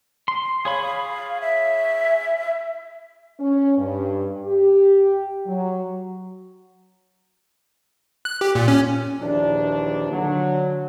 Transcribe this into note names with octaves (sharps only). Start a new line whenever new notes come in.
C6
G#4 C#5 F5 B5
E5
C#4
G2
G4
F#3
F#6
G4
A#2
C#4
A#1 D#2 E3 D4
D3 F#3